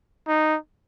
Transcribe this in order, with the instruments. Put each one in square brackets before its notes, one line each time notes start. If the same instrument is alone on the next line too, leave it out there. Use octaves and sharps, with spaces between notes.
[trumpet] D#4